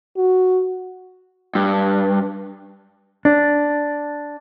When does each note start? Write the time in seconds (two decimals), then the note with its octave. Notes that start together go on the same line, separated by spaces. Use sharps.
0.17 F#4
1.55 G2
3.25 D4